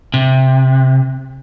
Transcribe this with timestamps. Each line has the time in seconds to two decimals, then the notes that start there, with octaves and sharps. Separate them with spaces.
0.14 C3